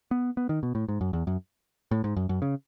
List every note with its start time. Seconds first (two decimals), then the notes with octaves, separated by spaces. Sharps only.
0.11 B3
0.37 B3
0.49 D#3
0.63 B2
0.75 A2
0.89 G#2
1.01 F#2
1.13 E2
1.27 F#2
1.91 A2
2.04 G#2
2.17 F#2
2.29 F#2
2.42 C#3